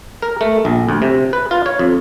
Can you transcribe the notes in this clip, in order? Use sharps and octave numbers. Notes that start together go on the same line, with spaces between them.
A#4
A3
A#1
D2
C3
B4
F4
C#5
F2